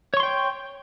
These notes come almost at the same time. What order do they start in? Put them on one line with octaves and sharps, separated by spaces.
C#5 C#6 C6 G5